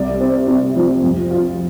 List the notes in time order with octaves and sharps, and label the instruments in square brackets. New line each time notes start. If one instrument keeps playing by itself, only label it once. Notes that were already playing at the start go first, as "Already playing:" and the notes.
Already playing: [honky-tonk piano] C2 D5
C4
C3
F3
F2
F4